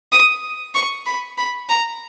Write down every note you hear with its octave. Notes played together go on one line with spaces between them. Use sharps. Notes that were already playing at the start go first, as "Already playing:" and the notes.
D#6
C#6
B5
B5
A#5